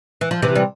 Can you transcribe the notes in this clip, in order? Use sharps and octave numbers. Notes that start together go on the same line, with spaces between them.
E3
F3
C3 E3
G3